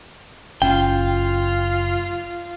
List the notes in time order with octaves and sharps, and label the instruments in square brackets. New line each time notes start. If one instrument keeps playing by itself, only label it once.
[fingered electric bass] F#1 C#4 [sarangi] F4 [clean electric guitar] G5